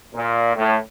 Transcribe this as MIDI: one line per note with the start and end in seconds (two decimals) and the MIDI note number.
0.14 0.51 46
0.56 0.76 45